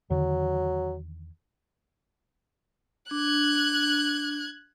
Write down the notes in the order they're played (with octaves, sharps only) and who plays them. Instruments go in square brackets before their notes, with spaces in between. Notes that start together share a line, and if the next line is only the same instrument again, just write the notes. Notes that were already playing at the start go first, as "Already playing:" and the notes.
[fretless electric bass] E2 D3 D#3 [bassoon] F#3
[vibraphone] D4 [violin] F#6 G#6